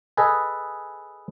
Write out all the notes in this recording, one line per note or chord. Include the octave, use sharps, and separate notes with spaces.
G#4 A4 B4 D#5 G#5